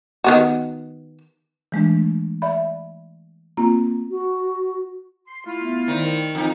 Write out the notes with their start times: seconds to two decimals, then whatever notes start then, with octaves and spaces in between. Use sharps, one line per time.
0.24 D#3 B3 F#4
1.72 E3 G#3 A3 D4
2.42 D5 E5 B5
3.57 A#3 C4 F4 A#5
4.09 F#4
5.27 C6
5.46 A3 E4 F4
5.61 B3 E5
5.88 D#3 C5 D5 D#5
6.03 A#4 G5
6.35 F2 C4 D#4 F4